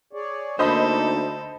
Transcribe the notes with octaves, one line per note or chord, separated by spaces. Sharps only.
G#4 C#5 D5
D2 A#3 D#4 A4 C5 D#5 B5